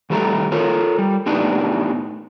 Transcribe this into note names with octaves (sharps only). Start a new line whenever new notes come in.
D#3 G3 A3 A4 A#5
F4 A4 A#4 C#5
G3
A2 B3 D4 D#4 G4